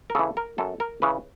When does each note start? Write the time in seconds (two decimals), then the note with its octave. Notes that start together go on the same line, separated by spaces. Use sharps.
0.10 A#4
0.15 C#3 E3 A4
0.37 A#4
0.58 F#2 A4
0.80 A#4
1.02 C#3 E3 B4